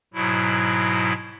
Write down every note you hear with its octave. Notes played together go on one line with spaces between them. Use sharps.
G#2 B2 F#3 E4